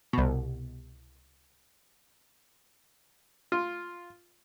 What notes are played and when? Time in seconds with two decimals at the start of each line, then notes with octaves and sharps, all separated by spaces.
0.13 C2 B2
3.52 F4